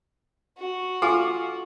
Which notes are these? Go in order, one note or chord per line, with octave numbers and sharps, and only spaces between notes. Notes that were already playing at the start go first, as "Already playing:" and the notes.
F#4
F4 A4 G#5 D6